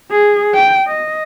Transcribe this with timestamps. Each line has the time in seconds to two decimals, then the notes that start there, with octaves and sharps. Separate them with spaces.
0.11 G#4
0.54 G5
0.87 D#5